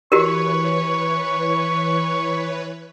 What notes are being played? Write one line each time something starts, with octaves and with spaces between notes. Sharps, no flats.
E3 F#4 G4 A#4 B4 C#5 C#6